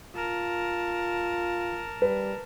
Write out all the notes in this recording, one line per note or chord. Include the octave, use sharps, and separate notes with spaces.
F4 A#4 A5
G3 B4